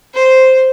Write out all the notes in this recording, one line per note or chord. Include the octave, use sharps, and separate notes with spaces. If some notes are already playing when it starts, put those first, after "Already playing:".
C5